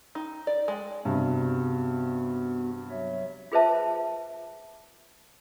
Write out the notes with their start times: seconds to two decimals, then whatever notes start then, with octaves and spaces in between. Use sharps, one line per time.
0.15 D#4
0.47 D5
0.68 G#3
1.05 G2 C3 B3 F#4
2.90 F#3 C#5 E5
3.52 F4 G#4 B4 C5 E5 A5